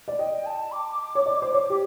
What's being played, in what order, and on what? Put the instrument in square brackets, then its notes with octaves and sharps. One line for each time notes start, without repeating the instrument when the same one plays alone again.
[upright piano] D5
[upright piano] D#5 [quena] G5
[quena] A5
D6
[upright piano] C#5
D5
C5
C#5
G4